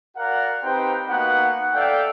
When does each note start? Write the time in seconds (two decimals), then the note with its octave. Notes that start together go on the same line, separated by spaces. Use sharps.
0.17 F#4 A#4 D5 F5 F#5
0.63 C4 D#4 G4 B4 C5 G5
1.09 A#3 B3 D#4 F#4 F#5
1.74 A4 D5 E5 F5 G5